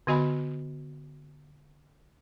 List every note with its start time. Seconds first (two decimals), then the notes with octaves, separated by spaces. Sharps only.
0.07 D3 B3 F#4 D#5 G#5 B5